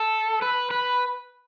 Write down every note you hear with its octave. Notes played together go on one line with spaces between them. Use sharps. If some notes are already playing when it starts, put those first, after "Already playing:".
Already playing: A4
B4
B4